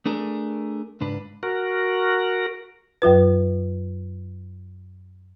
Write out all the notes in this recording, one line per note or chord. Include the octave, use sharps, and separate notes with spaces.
A3 D4 G#4 A#4
C#2 G#2 D4 B4
F#4 A#4
F#2 F#3 F4 B4